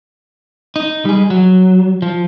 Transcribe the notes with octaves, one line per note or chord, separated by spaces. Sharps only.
D#4
G3 G#4
F#3
F3